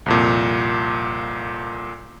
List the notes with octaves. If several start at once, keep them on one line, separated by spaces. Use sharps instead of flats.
C2 F2 A#2